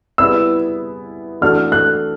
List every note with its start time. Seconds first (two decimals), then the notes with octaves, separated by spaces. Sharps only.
0.18 G3 B3 E4 G#4 E6
1.41 E3 A3 D4 F#4 A4 F6
1.72 F#6